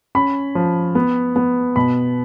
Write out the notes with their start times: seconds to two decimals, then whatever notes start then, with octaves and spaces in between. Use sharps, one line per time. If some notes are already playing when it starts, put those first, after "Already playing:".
0.15 C#4 B5
0.55 F3
0.95 B3
1.36 B3
1.76 B2 B5